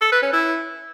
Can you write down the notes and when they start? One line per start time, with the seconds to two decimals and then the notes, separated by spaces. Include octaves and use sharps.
0.02 A4
0.12 B4
0.23 C#4
0.33 E4